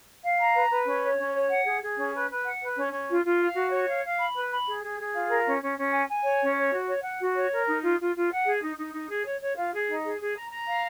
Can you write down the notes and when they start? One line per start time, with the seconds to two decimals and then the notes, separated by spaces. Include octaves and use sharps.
0.23 F5
0.38 A#5
0.54 B4
0.69 B4
0.85 C#4
1.01 C#5
1.17 C#4
1.33 C#5
1.48 F#5
1.65 G#4
1.80 G#4
1.96 C#4
2.12 B4
2.28 B4
2.44 F#5
2.60 B4
2.76 C#4
2.91 C#4
3.08 F4
3.23 F4
3.39 F5
3.54 F#4
3.71 C#5
3.86 F5
4.03 F5
4.18 B5
4.34 B4
4.50 B5
4.65 G#4
4.81 G#4
4.98 G#4
5.13 F4
5.29 A#4
5.44 C#4
5.60 C#4
5.76 C#4
5.91 G#5
6.08 G#5
6.24 C#5
6.39 C#4
6.55 C#5
6.71 F#4
6.87 C#5
7.02 F#5
7.19 F#4
7.34 C#5
7.50 A#4
7.66 D#4
7.82 F4
7.98 F4
8.14 F4
8.29 F#5
8.45 G#4
8.61 D#4
8.77 D#4
8.92 D#4
9.08 G#4
9.24 C#5
9.40 C#5
9.56 F4
9.72 G#4
9.87 D#4
10.03 G#4
10.19 G#4
10.36 A#5
10.51 A#5
10.67 F5